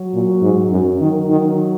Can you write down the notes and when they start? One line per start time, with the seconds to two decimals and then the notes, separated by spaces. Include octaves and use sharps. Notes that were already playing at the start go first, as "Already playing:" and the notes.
Already playing: F#3
0.14 A#2
0.42 G#2
0.71 F#2
1.00 D#3 F#3
1.30 D#3